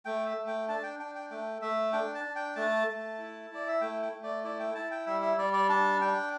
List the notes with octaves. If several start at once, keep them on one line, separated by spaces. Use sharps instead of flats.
A3 G5
E5
A3
G5
D4 A5
G5
D4 G5
G5
A3 G5
A3 E5
D4 G5
A5
D4
G5
A3 A5
A3
E4
E4 D5
E5
A3 G5
G5
A3
D5
E4 D5
G5
E4 A5
G5
G3 E5
E5
G3 D5
D5
D4 A5
D4 G5